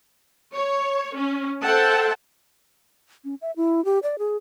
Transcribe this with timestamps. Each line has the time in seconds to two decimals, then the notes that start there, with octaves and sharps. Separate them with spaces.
0.55 C#5
1.16 C#4
1.62 A4 C5 E5 F#5 G5 A5
3.25 C#4
3.41 E5
3.56 E4
3.85 G4
4.03 D5
4.19 G#4